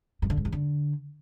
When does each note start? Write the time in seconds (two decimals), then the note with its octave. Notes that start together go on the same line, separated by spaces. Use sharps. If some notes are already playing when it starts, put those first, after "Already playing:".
0.22 G2
0.30 D3
0.37 G#2
0.45 E2
0.52 D3